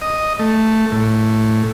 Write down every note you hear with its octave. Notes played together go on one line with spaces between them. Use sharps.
D#5
A3
A2